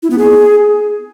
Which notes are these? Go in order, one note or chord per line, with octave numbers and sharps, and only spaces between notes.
E4
B3
G#4